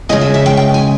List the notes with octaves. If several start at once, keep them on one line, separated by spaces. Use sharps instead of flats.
C#3 G#3 C#4 D#5
E5
E5
G5
G5
G#5